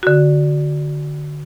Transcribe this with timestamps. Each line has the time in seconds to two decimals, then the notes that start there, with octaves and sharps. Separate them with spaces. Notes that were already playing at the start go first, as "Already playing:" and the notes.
0.03 D3 F#4